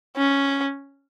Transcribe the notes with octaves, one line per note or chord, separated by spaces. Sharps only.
C#4